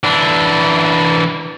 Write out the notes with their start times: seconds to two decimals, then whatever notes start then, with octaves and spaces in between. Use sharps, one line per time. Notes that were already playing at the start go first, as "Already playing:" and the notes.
0.04 E3 D4